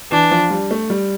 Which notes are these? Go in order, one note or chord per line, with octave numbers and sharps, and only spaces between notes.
E3 D4
F3
G3
A3
G3